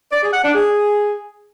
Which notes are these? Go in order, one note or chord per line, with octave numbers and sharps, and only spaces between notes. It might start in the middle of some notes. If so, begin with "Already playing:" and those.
D5
G#4
F#5
D4
G#4